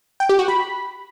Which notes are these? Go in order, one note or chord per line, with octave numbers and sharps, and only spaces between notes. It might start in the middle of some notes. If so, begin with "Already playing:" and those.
G5
G4
F#4
B5